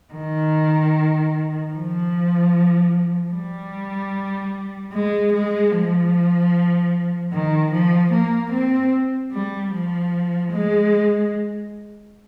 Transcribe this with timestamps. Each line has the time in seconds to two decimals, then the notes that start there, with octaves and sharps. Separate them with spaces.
0.13 D#3
1.74 F3
3.33 G3
4.92 G#3
5.33 G#3
5.72 F3
7.33 D#3
7.72 F3
8.12 A#3
8.52 C4
9.32 G3
9.72 F3
10.52 G#3